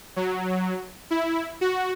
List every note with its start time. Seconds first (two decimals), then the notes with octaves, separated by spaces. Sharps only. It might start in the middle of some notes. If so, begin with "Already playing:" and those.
0.16 F#3
1.11 E4
1.61 F#4